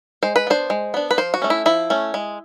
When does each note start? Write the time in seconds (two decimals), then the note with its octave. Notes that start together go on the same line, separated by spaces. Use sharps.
0.23 G#3 C5
0.36 B4
0.47 B3 D4 C5
0.70 G#3
0.94 B3 D4
1.11 B4
1.18 F3 C5
1.34 F#4
1.42 A3 C#4
1.50 E4
1.66 F3 E4
1.90 A3 C#4
2.14 G#3